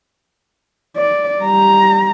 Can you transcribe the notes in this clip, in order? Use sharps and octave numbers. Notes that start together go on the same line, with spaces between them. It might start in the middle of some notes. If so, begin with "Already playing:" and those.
D5
G3 A#5